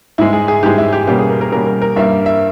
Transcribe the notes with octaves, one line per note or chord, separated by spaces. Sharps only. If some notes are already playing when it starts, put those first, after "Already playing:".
G#2 E3 G#3 E4
G#4
G#4
G#2 E3 G#3 G4
E4
G4
B2 G3 A#3 C#4 G4
G#4
A#4
A#4
B2 G3 A#3 C#4 A#4
A#4
A#4
G2 G3 A#3 E5
E5